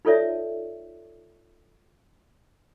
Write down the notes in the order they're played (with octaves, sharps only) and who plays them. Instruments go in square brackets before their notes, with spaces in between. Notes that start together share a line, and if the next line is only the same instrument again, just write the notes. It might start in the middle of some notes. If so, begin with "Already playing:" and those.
[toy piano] D#4 F4 A4 C#5 D5 E5